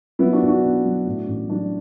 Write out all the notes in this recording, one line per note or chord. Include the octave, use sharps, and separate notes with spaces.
F#3 B3 E4
D4 F#4
B1
D4 F#4
B2
F#3
A2
A1
F#3 D4